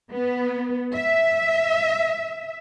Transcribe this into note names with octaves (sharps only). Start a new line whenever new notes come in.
B3
E5